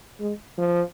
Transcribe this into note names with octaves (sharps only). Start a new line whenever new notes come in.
G#3
F3